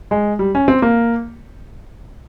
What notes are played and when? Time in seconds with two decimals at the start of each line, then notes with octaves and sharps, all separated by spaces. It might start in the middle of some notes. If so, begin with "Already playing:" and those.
0.11 G#3
0.39 G3
0.55 C#4
0.68 C4
0.82 A#3